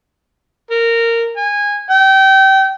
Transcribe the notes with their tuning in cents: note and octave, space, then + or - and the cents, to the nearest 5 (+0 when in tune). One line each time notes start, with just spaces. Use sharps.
A#4 -15
G#5 -20
G5 -25